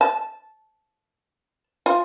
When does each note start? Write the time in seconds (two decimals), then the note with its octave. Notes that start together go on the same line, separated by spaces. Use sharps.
0.01 A5
1.86 F4